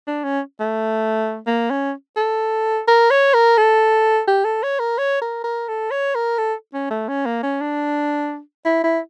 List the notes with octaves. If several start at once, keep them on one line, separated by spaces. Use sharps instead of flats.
D4
C#4
A3
A#3
C#4
A4
A#4
C#5
A#4
A4
G4
A4
C#5
A#4
C#5
A#4
A#4
A4
C#5
A#4
A4
C#4
A3
C#4
A#3
C#4
D4
E4
E4